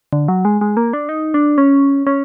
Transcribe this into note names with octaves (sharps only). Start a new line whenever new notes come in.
D3
F#3
G#3
G#3
A#3
D4
D#4
D4
C#4
C#4